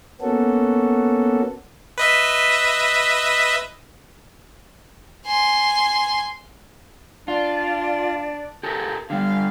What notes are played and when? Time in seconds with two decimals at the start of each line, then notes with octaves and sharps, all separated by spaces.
0.21 A#3 B3 C#4 F#4 A4
1.98 B4 D#5 E5
5.26 G#5 C6
7.28 D4 F4 D5
8.63 G4 A4 A#4
9.10 D3 G3 G4 F5